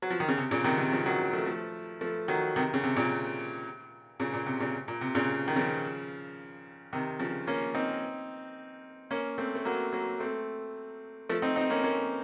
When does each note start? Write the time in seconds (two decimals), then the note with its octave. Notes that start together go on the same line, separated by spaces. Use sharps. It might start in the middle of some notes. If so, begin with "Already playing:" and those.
0.02 F#3
0.10 F3
0.20 D#3
0.28 C#3
0.38 C3
0.51 A#2 C#3
0.64 C3 D#3
0.78 C3 D#3
0.92 C#3 F3
1.06 D#3 F#3
1.33 F3 A3
1.46 F3 A3
2.01 F3 A3
2.28 D#3 F#3
2.56 C3 D#3
2.74 C#3
2.83 C3
2.96 A#2 C#3
4.20 A#2 C#3
4.34 A#2
4.46 C3
4.60 A#2 C#3
4.88 A#2
5.01 C3
5.15 A#2 C#3
5.48 D#3
5.56 C#3 F3
6.93 C3 D#3
7.19 C#3 F3
7.47 A#3 C#4
7.75 C4 D#4
9.11 A#3 C#4
9.38 A3 C4
9.55 A3
9.65 F#3 A#3
9.93 F#3 A#3
10.20 A3 C4
11.29 F3 A3
11.42 C4 D#4
11.56 C4 D#4
11.70 A#3 C#4
11.83 A#3 C#4